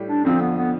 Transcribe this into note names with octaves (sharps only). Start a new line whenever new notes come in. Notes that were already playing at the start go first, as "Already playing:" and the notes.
Already playing: A2 G3 G4
D4
F2 D3 F3 C4
B3
B3